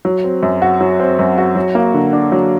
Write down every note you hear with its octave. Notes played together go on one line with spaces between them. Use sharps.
F#3
C4
F#2
F#4
F#3
C4
F#2
F#4
F#3
A#3
D3
D4
F#3